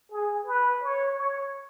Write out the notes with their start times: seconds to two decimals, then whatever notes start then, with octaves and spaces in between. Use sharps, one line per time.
0.11 G#4
0.46 B4
0.83 C#5
1.17 C#5